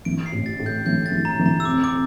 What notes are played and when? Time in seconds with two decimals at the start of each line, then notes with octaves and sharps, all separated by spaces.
0.05 E3 D7
0.26 C7
0.32 A1
0.46 A6
0.60 A2
0.66 G6
0.86 E3 G6
1.06 A6
1.12 E3
1.25 A#5
1.39 E3
1.46 A#5
1.60 E6
1.65 F2 D6
1.84 D6